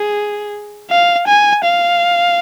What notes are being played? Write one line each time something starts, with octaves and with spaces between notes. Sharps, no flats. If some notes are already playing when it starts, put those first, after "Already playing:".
Already playing: G#4
F5
G#5
F5